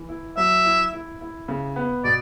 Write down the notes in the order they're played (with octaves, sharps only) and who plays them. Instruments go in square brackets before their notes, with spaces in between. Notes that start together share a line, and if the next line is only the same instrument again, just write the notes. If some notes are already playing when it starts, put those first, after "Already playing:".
Already playing: [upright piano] E3
E4
[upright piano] F#3 [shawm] E5
[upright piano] E4
E4
E4
C#3
B3
[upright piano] B2 [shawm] D5